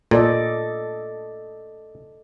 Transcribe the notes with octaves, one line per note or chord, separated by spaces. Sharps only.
A#2 A4 D5 D#5